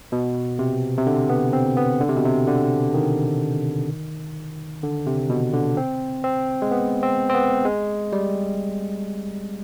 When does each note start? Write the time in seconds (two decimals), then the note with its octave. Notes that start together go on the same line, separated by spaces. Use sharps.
0.12 B2
0.59 C3
0.98 C3
1.06 D3
1.29 B3
1.53 C4
1.77 B3
2.00 D3
2.09 C3
2.17 B2
2.25 C3
2.47 D3
2.94 D#3
4.83 D3
5.06 C3
5.29 B2
5.53 D3
5.77 C4
6.24 C4
6.62 G#3
6.71 B3
7.03 C4
7.29 C4
7.34 B3
7.65 G#3
8.12 G3